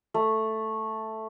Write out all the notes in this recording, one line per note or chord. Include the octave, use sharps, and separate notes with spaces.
A3